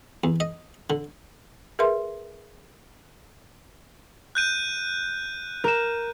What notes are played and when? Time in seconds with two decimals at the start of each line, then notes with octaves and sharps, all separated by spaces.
0.24 E2
0.40 D#5
0.90 D3
1.79 G#4 A#4 B4 E5 C6
4.35 F#6 G6 D#7
5.64 A#4 E7